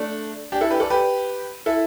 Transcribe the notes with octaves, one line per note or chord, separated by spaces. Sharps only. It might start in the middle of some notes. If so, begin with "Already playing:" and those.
Already playing: A3 D4
D4 G4
E4 A4
G4 B4
A4 D5
G4 B4
E4 A4